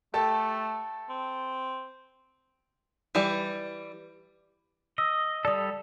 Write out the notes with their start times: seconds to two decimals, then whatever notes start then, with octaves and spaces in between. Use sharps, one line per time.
0.14 A3 G4 A4 A5
1.09 C4
3.15 E3 G3
4.98 D#5 E6
5.45 G3 A4 D5 D#6